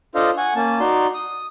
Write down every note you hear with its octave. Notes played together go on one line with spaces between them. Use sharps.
D4 F4 A4 C5 D#5 F5
F#5 G#5 C#6
A#3 C#4 A5
D#4 F#4 D5 C6
D#6